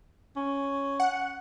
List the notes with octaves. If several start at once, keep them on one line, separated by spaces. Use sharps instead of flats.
C#4
F#5